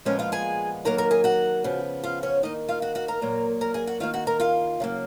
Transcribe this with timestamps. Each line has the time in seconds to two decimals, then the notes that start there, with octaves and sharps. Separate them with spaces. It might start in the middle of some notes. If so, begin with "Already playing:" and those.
0.05 A#2 F3 G#3 B3 C#4 C#5
0.19 F4 F5
0.32 G#4 G#5
0.85 D#3 F#3 A#3 A#4 A#5
0.98 A#4 A#5
1.11 G#4 G#5
1.24 F#4 F#5
1.64 C#3 F3 B3
2.04 F4 F5
2.23 C#4 C#5
2.43 D#3 A#3 D#4 D#5
2.69 F4 F5
2.82 F#4 F#5
2.95 F#4 F#5
3.08 A#4 A#5
3.21 A#2 F#3 A#3
3.61 A#4 A#5
3.74 G#4 G#5
3.87 F#4 F#5
4.00 D#3 A#3 F4 F5
4.14 F#4 F#5
4.27 A#4 A#5
4.40 F4 F5
4.80 C#3 F#3 A#3